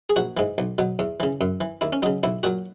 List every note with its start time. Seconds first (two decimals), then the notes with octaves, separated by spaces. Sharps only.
0.10 G#4
0.16 A#1 F#4
0.37 G#2 E3
0.58 B1
0.78 B2 F#3
0.99 E2
1.20 C#3 E3
1.41 F#2
1.61 E3
1.81 D#2 E4
1.93 C#4
2.02 C#3 F#3 D#4
2.23 B1 E4
2.43 A#2 F#3 F#4